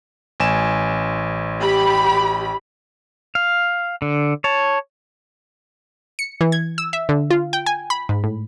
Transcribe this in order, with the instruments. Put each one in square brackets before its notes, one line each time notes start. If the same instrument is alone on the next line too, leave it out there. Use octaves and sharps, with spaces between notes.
[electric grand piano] A1 G#5 E7
[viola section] G4 B5
[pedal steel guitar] F5
D3
C#5 A5
[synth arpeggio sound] C#7
E3
G#6
E6
E5
D3
F4
G5
G#5
B5
G#2
A2